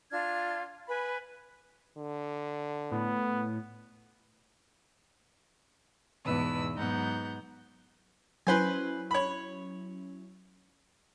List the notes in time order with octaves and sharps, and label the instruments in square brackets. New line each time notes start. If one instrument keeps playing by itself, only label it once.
[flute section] D4 F4 F6 G#6
B4 G#5 B5
[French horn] D3
[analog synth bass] A2 [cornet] B3
[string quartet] E2 G#2 B2 B4 E6
G#2 F#3 B3 D#4 F#5 G6
[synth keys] F#3 C#4 E4 [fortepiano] B4 C5 G#5
[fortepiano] C#5 B5